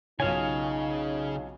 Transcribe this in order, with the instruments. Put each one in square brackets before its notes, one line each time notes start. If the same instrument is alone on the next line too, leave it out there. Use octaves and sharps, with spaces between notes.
[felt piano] B1 F4 C#5 [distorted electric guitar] C#3 [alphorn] D#4 [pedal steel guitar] F5 G#5